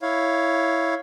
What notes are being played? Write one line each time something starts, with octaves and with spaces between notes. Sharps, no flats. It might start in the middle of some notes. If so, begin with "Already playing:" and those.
E4 C#5 F5